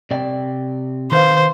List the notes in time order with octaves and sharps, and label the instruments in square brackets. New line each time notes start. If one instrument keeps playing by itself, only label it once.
[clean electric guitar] C3 D5 G5
[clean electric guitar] D#3 B4 F5 [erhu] C5